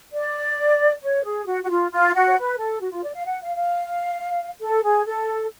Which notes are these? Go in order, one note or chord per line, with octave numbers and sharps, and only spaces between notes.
D5
C#5
G#4
F#4
F#4
F4
F4
F#4
C#5
B4
A4
F#4
F4
D5
F5
F#5
F5
F5
A4
G#4
A4